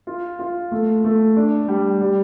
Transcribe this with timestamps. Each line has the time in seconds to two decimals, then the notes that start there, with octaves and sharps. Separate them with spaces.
0.07 F4
0.39 F4
0.71 A3
1.04 A3
1.36 D4
1.68 G3
2.01 G3